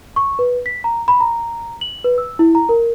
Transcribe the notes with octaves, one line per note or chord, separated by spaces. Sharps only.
C#6
B4
B6
A#5
B5
A#5
F#7
B4
E6
E4
A#5
A#4